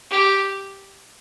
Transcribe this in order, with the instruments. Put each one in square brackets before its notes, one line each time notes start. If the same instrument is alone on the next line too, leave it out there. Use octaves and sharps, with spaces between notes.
[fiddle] G4